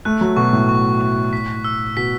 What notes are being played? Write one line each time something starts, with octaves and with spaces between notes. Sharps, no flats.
A3 F#6
F#3
B2 C#6
A2
C#6
C#6
B6
E6
B2 B6